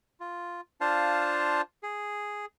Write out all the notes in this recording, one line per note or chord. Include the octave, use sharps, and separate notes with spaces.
F4
D4 F4 C5 F5 A5
G#4